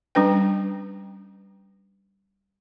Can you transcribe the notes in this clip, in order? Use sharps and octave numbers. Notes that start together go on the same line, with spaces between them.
G3 C#4 D4 B4 G5